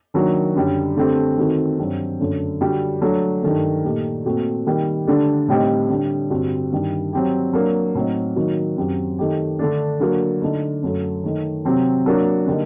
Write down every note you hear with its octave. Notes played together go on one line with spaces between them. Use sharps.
D#3 F#3 A#3 D4 F#4
F#2 D3 G3 D4
D3 A3 C4 G4
D#3 A3 C4 F#4
G2 F#3 C4
F#2 D3 A3
D3 G3 D4 F#4
F#3 A3 D4
G2 D#3 A3
A#2 A3 D#4 G4
A#2 A3 C4 F#4
D#3 G3 A#3
D3 A3 D4 G4
A2 G3 C4 D#4 G4
D3 G3 D4
G2 D3 G3 C4 F#4
G2 D#3 G3
F#3 C4 G4
F#3 A#3 D4
A2 F#3 C4 D#4
D#3 F#3 A#3 D#4 F#4
F#2 F#3 C4 G4
D#3 A3 D#4 G4
D3 A3 D4
D3 F#3 A#3 F#4
D3 A3 D#4
F#2 F#3 A3
D#3 A3 D#4
C3 F#3 C4 G4
F#3 A#3 D4 F#4
D3 G3 A#3 D#4